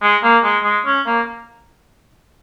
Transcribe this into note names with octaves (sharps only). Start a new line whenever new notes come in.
G#3
A#3
G#3
G#3
C#4
A#3